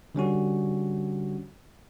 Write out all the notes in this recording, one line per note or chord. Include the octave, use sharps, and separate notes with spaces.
D3 G3 C#4 F#4